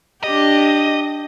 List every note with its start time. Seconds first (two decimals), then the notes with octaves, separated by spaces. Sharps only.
0.23 D4 G4 D#5